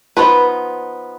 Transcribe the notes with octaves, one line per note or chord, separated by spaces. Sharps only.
F3 B3 D#4 B4